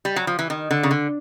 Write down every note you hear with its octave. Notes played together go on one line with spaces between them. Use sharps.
G3
F#3
F3
E3
D#3
D3
C#3
D3